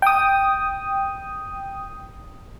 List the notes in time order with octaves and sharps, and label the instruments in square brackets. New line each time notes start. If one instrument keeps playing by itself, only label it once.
[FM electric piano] G5 D#6